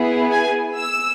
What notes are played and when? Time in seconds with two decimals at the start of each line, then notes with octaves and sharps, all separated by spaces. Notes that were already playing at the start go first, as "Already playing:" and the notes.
Already playing: B3 E4 G#4
0.32 G#5
0.78 E6